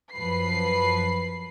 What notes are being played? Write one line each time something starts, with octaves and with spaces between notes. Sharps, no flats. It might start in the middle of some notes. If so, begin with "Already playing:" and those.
F#2 F3 B4 B5 C7